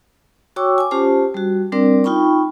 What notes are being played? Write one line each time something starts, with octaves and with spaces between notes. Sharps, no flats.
F#4 C#5 G5 C#6 D6 E6
G#5 D6
C#4 F4 G4 C5 A5
G3 F#4
G3 C4 D4 A#4 D5
D#4 F4 G5 B5 C#6